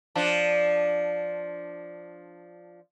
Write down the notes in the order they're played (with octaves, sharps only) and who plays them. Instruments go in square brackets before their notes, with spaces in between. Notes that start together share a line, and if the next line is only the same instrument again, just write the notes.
[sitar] F3 D4